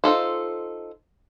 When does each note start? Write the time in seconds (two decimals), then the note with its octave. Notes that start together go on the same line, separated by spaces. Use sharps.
0.04 D#4 F4 A4 C5